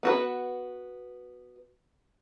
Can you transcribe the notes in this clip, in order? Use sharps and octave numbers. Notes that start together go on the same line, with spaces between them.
B3 F#4 B4